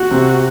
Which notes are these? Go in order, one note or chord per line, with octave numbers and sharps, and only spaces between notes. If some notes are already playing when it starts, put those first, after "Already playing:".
Already playing: F#4
C3 C4